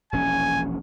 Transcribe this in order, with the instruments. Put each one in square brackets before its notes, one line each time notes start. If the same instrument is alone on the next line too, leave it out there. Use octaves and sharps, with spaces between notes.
[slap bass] E1 A#1 C#4 [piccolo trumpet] G#5